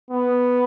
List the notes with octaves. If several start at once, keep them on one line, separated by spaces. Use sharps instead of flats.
B3